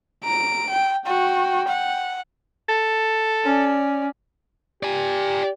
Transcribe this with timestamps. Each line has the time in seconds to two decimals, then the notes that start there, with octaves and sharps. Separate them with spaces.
0.24 A#5 D7
0.70 G5
1.06 F#4 G5
1.68 F#5
2.69 A4
3.44 C#4 D5
4.83 G4 D5 G#5